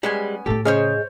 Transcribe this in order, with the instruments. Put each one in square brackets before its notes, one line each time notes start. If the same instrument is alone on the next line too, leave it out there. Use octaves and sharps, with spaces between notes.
[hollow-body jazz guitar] G3 G#3 [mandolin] B3 C#4 G#5
[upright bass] A2 A3 [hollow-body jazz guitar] G4 A4
[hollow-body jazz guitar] C#3 [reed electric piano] G#4 D#5 [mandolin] C5 C#5 F6